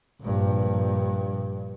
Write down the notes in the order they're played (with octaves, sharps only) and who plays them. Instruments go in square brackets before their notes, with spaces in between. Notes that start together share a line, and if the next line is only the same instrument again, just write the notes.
[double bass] A#1 G2